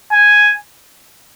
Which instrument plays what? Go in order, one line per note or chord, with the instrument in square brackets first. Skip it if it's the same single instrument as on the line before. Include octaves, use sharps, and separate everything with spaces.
[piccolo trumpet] G#5